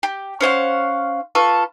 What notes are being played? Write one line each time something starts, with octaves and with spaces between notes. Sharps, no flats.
G4
C#4 C5 F5 F#5
F4 A4 B4 C#6